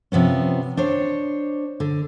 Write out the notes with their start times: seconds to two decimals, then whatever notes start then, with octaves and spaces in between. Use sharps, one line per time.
0.12 C3 F3 B3 C#4
0.77 D4 C5 C#5
1.80 D3